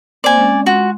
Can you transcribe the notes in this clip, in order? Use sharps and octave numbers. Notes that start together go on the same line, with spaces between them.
A#3 C4 C5 D5 G#5
G#3 C4 C#4
G#3 F4 F#4 C6